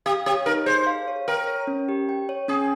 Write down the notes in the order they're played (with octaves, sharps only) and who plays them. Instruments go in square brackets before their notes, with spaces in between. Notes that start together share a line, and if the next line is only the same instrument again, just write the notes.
[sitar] G4 [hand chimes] F5
[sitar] G4 [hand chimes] C#5
[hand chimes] D#4 [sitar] A#4
[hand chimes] G#4 [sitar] C5
[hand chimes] F5
C#5
[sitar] A#4 [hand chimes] G5
[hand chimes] C#5
C#4
G4
G5
C#5
[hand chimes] C#4 [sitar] G#4